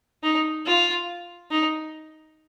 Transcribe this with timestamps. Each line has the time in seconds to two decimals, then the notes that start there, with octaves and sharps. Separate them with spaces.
0.23 D#4
0.66 F4
1.50 D#4